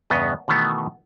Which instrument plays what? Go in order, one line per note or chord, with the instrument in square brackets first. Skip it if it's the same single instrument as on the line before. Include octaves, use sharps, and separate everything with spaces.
[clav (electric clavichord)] E2 G2 C#3 B3 D#5
B2 D#3 E3 A3 B3